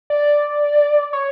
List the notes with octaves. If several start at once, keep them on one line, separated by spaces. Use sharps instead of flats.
D5
C#5